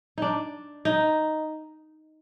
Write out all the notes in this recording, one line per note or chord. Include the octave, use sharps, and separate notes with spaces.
D4 D#4
D#4